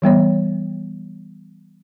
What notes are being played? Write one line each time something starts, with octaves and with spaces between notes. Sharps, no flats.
E3 G3 B3 C#5